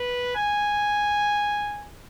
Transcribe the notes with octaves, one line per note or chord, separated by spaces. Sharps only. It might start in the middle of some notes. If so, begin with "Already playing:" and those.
Already playing: B4
G#5